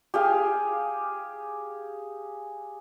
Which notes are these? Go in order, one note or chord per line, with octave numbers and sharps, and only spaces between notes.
G4 G#4 F5